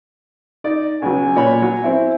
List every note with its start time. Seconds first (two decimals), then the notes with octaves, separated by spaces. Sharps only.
0.64 D#4 D5
1.02 C#2 F#3 G#5
1.36 A#2 C#5 B5
1.62 F#3
1.84 C4 E4